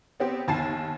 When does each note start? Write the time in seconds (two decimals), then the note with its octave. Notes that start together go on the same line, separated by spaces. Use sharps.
0.20 B3 C4 G4 C5
0.48 G1 D#2 G#5 A5 A6 C7